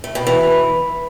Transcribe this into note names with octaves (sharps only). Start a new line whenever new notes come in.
A3
B2
E3